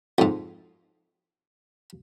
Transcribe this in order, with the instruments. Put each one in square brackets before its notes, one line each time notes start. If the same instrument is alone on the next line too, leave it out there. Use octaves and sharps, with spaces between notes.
[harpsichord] F2 G#2